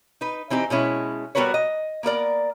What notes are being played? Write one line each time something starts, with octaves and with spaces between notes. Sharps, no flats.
D#4 B4
E3 C4 D#4 G4
B2 G#3 C#4 E4
G3 B3 F#4 A#4 B4 C#5
D#5
A#3 B3 A#4 D5